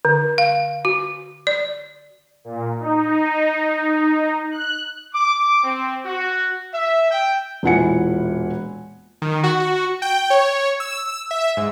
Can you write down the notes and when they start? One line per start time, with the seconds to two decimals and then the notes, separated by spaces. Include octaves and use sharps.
0.05 D3
0.38 F5
0.85 F#4
1.47 D5
2.45 A#2
2.80 D#4
4.52 F#6
5.15 D6
5.64 C4
6.06 F#4
6.74 E5
7.11 G5
7.63 E1 A#2 E3 F#5 G#5 C#7
9.22 D#3
9.43 F#4
10.02 G5
10.30 C#5
10.80 E6
11.31 E5
11.57 G#2